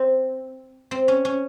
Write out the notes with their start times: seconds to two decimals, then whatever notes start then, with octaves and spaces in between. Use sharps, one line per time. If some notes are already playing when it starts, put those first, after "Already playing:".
Already playing: C4
0.91 C4
1.08 C#4
1.25 C#4